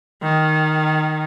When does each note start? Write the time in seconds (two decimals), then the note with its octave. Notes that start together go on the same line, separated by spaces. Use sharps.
0.22 D#3